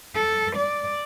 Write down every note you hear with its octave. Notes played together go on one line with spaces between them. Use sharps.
A4
D5